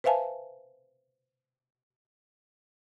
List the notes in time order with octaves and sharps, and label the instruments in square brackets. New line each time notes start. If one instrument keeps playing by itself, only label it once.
[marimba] B4 C5 E5 F5 G#5 A5